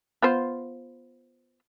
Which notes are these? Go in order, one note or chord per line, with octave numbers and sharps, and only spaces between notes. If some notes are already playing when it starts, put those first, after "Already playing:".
B3 F4 C5